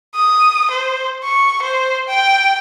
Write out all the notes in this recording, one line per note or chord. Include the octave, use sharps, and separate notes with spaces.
D#6
C5
C#6
C5
G5